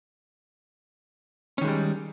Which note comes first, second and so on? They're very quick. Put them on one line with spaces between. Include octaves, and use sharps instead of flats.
C#4 D#3 G#3 G3